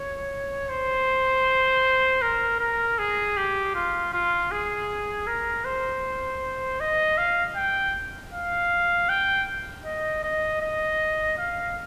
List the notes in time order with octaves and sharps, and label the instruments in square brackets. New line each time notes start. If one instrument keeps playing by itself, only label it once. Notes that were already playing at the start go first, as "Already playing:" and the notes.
Already playing: [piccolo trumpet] C#5
C5
A#4
A#4
G#4
G4
F4
F4
G#4
A#4
C5
D#5
F5
G5
F5
G5
D#5
D#5
D#5
F5